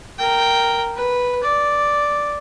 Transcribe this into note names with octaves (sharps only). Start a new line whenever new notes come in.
A#4 G5
B4
D5